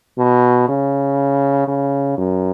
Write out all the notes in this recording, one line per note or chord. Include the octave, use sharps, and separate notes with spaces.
B2
C#3
C#3
F#2